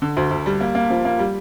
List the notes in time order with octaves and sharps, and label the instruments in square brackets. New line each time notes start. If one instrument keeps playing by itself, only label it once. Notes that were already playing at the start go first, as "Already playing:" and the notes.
[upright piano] D3
D2
D2
G3
A#3
A#3
F3
A#3
G3